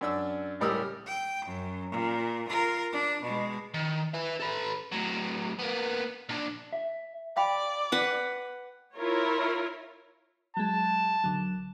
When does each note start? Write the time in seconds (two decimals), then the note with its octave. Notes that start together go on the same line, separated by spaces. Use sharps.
0.01 F#2 D4 E6
0.60 C#2 A2 G3 A#4 D#6 E6
1.07 G5
1.45 F#2
1.90 A#2
2.49 F4 A#4
2.92 D4
3.23 B2 G#3
3.74 D#3
4.14 B4 E5
4.40 A4 B4
4.92 A2 F#3
5.59 A#3 B3
6.29 A#2 D4
6.73 E5
7.37 D5 F5 G5 B5
7.92 B4 F#5
8.96 E4 F4 A#4 C#5
10.57 F#3 G#3 A5
11.24 A#1 D3 F#3